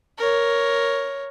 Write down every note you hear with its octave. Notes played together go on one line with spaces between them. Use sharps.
A#4 C#5